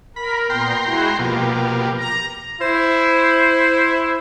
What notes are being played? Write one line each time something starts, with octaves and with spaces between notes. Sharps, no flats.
A#4 B5
A#2 B3 G5 A#5 C6
G#3 E4 F#4
B2 F3 A#3 G4
A#5
E4 C5